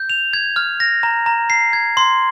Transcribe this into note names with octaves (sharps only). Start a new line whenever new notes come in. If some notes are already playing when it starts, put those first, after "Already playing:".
Already playing: G6
F7
G#6
F6
A#6
A#5
A#5
C7
G#6
C6